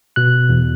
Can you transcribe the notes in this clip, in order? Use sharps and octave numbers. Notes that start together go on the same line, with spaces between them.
B2 F#6
E2